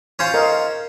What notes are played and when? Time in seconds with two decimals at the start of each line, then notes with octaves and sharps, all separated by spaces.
0.19 C#4 F4 C5
0.34 A#4 D#5 F5